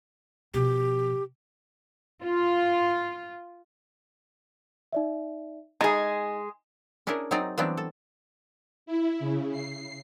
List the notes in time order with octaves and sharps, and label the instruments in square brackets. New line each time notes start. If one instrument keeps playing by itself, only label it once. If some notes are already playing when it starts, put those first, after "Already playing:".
[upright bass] B2 F3 [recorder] G4
[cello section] F4
[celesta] D#4 D5 E5
[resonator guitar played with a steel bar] G#3 G#4 [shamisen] D#4 [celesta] G#6 A6
[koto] C#4 D4 E4 G#4 A#4
F#3 C4 D#4 G#4 D5 A#5
E3 F#3 G3 B3 C4 D4
A4
[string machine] E4
C#3
C7